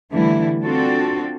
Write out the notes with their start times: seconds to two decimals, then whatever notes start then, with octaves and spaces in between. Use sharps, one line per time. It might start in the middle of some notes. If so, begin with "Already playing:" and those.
0.11 D3 E3 G3 A3 E4
0.63 C4 D4 F4 F#4 A4